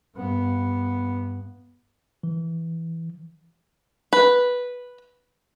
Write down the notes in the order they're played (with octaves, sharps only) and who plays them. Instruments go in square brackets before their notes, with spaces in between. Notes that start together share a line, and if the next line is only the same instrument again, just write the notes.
[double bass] G2 B3
[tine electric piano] E3
[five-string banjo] B4